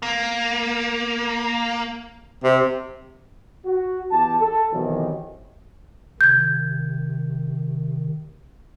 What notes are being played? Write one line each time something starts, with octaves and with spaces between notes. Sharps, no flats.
A#3
C3
F#4
E2 G4 A5
A4
B1 C3 D#3 E3
C3 D#3 G6 G#6